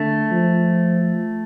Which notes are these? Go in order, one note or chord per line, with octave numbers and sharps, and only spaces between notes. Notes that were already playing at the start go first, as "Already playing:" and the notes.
Already playing: D3 A3
F3